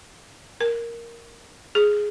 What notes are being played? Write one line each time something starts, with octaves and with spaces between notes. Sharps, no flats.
A#4
G#4